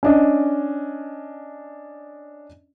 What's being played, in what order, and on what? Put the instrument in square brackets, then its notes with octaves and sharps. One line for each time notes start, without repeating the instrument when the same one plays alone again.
[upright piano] C#4 D4 D#5